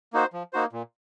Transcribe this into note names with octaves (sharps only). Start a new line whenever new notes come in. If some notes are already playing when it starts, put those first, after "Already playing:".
A#3 D#4 F#4 C5
F3
A#3 D#4 F#4 C5
A#2